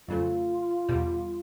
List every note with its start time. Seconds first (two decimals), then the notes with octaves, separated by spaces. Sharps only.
0.08 F2 C#3 F#3 A3 F4
0.89 E2 B2 G3